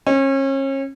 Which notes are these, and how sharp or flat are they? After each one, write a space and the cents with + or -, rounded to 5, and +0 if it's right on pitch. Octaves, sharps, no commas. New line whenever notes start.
C#4 -35